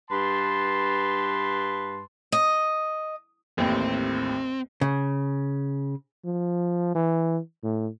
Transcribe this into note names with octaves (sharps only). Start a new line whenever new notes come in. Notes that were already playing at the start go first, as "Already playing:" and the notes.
G2 B4 A5 C6
D#5
A1 D#2 A2 C4
C#3
F3
E3
A2